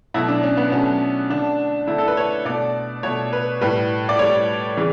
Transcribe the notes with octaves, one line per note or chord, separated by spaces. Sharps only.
B2 F#3 A3 E4
D4
C#4
B3
B2 F#3 A3 C#4
D3 A3 D4
D3 A3 E4
A4
B4
C#5
B2 A3 D5
B2 A3 C#5
B4
A2 G3 B4
D5
A2 G3 C#5
C#3 E3